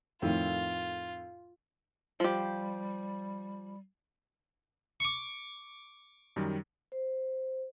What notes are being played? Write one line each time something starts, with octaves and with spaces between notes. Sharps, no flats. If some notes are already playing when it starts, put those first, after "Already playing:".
F2 A2 D#3 F4
F3 G3 G4
C#6 D6
F#2 D#3 G3
C5